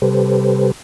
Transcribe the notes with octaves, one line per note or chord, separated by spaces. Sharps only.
C3 G3 G4 A4 B4 C5